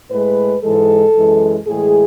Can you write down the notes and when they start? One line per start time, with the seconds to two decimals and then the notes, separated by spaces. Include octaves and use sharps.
0.11 A2 G#3 B4
0.63 G#2 E3 G#3 A4
1.16 F#2 E3 G#3
1.67 A2 E3 G#3 G#4